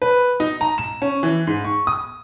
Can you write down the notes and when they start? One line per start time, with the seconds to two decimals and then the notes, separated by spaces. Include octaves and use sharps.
0.02 B4
0.40 D#4
0.61 A#5
0.78 E7
1.02 C#4
1.23 E3
1.47 G#2
1.64 C#6
1.87 D#6